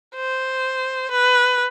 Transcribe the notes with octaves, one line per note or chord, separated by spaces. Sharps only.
C5
B4